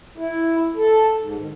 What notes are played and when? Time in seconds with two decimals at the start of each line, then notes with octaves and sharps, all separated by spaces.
0.18 E4
0.76 A4
1.19 G#2
1.38 D#3